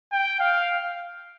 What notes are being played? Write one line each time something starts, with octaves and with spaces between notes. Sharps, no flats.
G5
F5